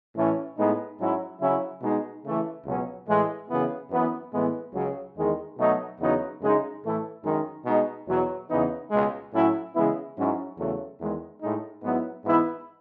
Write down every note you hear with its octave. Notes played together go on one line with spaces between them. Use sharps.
A2 E3 A3 C#4
A2 G#3 B3 D#4
G#2 F#3 C#4 E4
C#3 F#3 C#4 E4
B2 G#3 D#4
C#3 E3 A3
C#2 B2 F#3 C#4
A2 E3 G#3
F#2 C#3 E3 B3 E4
F#2 E3 B3
A2 E3 G#3 B3
C#2 C#3 F#3
E2 D#3 G#3
B2 F#3 A3 D#4
E2 C#3 F#3 B3 D#4
F#2 C#3 G#3 D#4
A2 E3 A3 E4
F#2 D#3 G#3 D#4
B2 G#3 D#4
E2 B2 F#3
E2 C#3 E3 B3 D#4
C#2 B2 G#3
A2 F#3 C#4 E4
C#3 E3 G#3 B3 E4
G#2 F#3 C#4 E4
E2 C#3 F#3 A3
E2 D#3 G#3
A2 G#3 D#4
G#2 F#3 B3 E4
G#2 E3 B3 E4